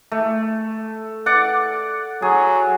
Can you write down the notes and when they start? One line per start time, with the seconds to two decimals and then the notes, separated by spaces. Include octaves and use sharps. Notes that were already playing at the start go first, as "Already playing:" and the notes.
0.12 A3
1.26 D5 F#5
2.22 F#3 G#4